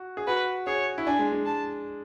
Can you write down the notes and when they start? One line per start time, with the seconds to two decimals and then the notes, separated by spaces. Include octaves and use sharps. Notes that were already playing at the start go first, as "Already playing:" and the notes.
Already playing: F#4
0.17 G#4
0.27 F#4 B4
0.66 G#4 C#5
0.98 E4
1.06 D4 G#5
1.19 G#3
1.32 G#3
1.46 A5